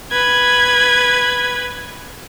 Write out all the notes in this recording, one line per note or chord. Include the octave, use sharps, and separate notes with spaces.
B4 G#6